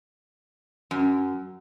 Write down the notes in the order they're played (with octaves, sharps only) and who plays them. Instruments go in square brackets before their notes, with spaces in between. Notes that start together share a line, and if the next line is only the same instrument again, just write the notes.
[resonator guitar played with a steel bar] F#2